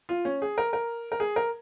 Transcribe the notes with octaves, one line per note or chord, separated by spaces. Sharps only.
F4
C#4
G#4
A#4
A#4
A#4
G#4
A#4